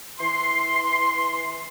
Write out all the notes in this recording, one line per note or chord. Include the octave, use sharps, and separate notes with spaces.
E3 C6